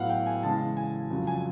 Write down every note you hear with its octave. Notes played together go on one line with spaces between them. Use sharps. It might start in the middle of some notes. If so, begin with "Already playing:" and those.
Already playing: A2 F#3 B3 F5 F#5
G5
G#5
C#3 E3 G#3 A5
G#5
F2 C#3 F#3
G#5